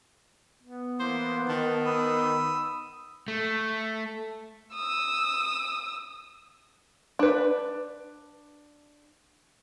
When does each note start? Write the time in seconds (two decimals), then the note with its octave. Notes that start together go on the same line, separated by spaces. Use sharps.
0.63 B3
1.00 E3 A#3 C5
1.49 D#3 A5
1.85 B5 D#6 E6
3.28 A3
4.75 D#6 E6
7.19 D4 B4